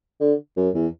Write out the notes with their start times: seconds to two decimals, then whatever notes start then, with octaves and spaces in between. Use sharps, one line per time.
0.20 D3
0.57 F#2
0.74 E2